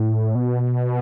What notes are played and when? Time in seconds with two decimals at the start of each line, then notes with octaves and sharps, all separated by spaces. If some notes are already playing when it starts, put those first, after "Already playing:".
Already playing: A2
0.35 B2